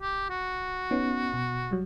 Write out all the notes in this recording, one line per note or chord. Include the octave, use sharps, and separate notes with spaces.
G4
F#4
B3 C#4 D#4
B2
F#3 G3